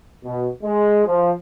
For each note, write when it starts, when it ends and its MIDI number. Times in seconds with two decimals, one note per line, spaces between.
0.24 0.48 47
0.63 1.06 56
1.06 1.32 53